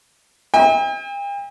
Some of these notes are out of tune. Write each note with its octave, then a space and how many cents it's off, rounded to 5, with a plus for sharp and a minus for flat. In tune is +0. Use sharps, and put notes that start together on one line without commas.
E5 -40 G5 +45